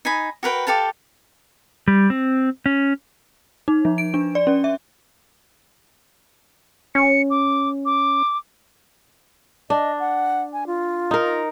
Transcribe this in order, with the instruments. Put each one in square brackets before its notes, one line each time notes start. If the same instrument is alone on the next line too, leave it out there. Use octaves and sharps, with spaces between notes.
[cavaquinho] D#4 G#5 B5
F#4 A#4 B4 G5
G4 A4 F5 A5
[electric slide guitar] G3
C4
C#4
[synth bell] D#4
F3
D7
D4
D5
C#4
E5
[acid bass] C#4 [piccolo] C#7
[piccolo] D6
D6
[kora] D4 [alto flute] D#5
[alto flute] F#5
G#5
F4
[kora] D#4 A#4